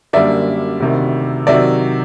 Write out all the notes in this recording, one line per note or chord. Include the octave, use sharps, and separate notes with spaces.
F#2 D3 G3 A#3 D5 E5
D2 C3 D#3
C3 D#3 F#3 D5 E5